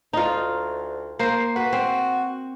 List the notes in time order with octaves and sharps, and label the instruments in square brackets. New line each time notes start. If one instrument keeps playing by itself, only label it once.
[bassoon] D2 [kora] D#4 F4
[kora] A#3 C5
[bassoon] F#4 [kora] B4
[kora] C4